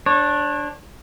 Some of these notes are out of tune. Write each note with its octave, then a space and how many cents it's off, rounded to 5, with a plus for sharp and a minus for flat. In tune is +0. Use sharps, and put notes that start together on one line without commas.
D4 +0 C#5 -35